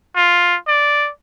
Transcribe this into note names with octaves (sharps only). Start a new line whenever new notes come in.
F4
D5